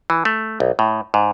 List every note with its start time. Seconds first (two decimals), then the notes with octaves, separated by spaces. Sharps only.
0.10 E3
0.25 A3
0.60 B1
0.79 A2
1.14 G#2